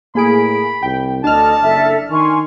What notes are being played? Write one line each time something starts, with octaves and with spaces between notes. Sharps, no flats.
A2 A#3 G#4 B5 D7
C2 G5
D2 D4 A4 D#5 A5 F6
F#1 A4 E5
D#3 G#5 C6 C#6